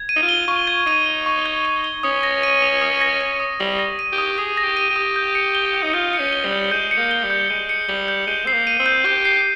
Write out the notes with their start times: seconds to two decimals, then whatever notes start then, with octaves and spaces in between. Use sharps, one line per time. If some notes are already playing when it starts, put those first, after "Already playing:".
Already playing: G#6
0.09 D#7
0.16 D#4
0.23 F4
0.29 G7
0.48 F4 C#6
0.67 G#6
0.86 D#4 D#7
1.06 G7
1.26 C#6
1.46 G#6
1.65 D#7
1.84 G7
2.03 C#4 D#6
2.23 A#6
2.43 D#7
2.62 D#6
2.82 D#6
3.01 A#6
3.21 D#7
3.40 D#6
3.60 G3 D#6
3.79 A#6
3.99 D#7
4.12 G4
4.18 D#6
4.38 G#4 D#6
4.57 A#6
4.63 G4
4.77 D#7
4.90 G4
4.96 D#6
5.16 G6
5.35 C#7
5.55 G7
5.74 G6
5.83 D#4
5.94 F4 G6
6.13 C#7
6.19 C#4
6.32 G7
6.45 G3
6.52 G6
6.71 G#3 G6
6.91 C#7
6.98 A#3
7.11 G7
7.24 G3
7.30 G6
7.50 G#3 G6
7.69 C#7
7.89 G3 G7
8.08 G6
8.27 G#3 G6
8.46 C4 C7
8.54 A#3
8.67 D#7
8.79 C4
8.86 G6
9.05 G4 G6
9.25 C7